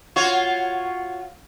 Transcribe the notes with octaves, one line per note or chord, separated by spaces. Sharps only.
F4 F#4 C#5